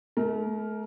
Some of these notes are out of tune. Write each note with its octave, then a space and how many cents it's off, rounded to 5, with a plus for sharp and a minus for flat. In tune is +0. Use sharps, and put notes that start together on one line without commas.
A3 -40 A#4 +0